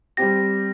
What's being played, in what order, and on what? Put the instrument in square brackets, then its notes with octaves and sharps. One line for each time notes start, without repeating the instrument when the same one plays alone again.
[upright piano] G3 C4 G4 [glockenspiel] A#6